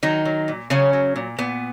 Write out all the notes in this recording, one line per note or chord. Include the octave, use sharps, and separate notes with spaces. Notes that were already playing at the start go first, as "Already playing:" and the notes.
D#3 F#3 D#4
F#3
A#2
C#3 F#3 C#4
F#3
A#2
A#2 B3